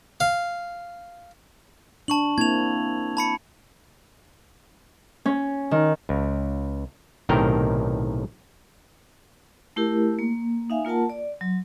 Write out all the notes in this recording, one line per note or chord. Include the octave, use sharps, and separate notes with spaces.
F5
D4 A5 C#6 F#7
A#3 C4 E4 G#6 F7
A5 B5 C#7
C#4
D#3
C#2
B1 A2 C3 D#3 A#4 G5
A3 E4 G4 A#4
A#3
D#4 E5 F5 G#5
A#3 F4 A#4 F#5 A5
D5
F#3